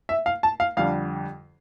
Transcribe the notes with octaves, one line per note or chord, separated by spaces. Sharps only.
E5
F5
A5
F5
F2 D3 G3 D4 F5